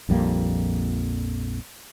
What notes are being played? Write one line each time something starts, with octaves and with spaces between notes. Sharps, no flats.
A#1 F2 G3 A#3